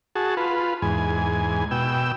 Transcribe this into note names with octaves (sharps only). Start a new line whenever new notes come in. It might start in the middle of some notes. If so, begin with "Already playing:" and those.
F#4 G#4 A5
F4 B4
E2 G#2 G#5
B2 G5 E6